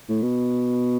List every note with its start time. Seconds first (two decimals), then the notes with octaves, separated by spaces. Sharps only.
0.09 A2
0.22 B2